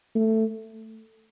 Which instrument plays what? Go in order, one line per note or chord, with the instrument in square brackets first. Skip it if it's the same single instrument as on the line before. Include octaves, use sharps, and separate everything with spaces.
[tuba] A3